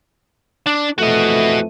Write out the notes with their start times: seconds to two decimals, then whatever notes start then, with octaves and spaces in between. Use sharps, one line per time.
0.67 D4
0.99 F2 E3 A3 F#4 D#5